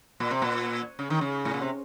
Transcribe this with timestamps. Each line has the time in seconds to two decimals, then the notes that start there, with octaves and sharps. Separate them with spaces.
0.20 A#2
0.31 C3
0.42 A#2
0.99 C#3
1.10 D#3
1.21 C#3
1.45 A2
1.54 A#2
1.61 C3